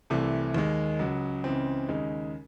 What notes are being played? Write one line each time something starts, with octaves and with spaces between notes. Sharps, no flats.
C2 C3 E3 A3
D#2 D#3 G#3
C#2 C#3 F#3
C#2 C#3 E3 C4
D#2 C#3 G#3 D#4